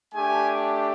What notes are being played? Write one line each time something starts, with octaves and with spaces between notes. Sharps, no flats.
A3 D4 G4 G#5